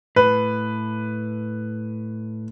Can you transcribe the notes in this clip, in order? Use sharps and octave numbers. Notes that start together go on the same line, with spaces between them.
A2 B4